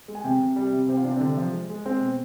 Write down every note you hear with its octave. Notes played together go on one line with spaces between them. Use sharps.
G#3
G#5
C3 G5
C3
G3
C3
C3 C5
F4
C3 D4
C4
D3 D4
F3
G#3
G#3
G#3 C4
B2